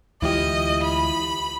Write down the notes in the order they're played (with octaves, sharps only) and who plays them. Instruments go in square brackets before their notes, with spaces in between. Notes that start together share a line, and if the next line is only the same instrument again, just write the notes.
[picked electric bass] D2 E3 G#3 [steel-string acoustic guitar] E4 F4 G4 [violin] D#5
[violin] B5